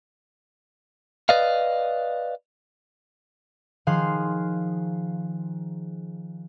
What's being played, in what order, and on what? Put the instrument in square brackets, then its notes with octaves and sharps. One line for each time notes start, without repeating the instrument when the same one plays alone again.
[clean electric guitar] B4 D5 D#5 F5
[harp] D#3 F3 G#4 F5 C6 F#6